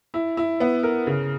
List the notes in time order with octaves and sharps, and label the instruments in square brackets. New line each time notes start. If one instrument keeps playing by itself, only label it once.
[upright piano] E4
E4
B3
A#4
C#3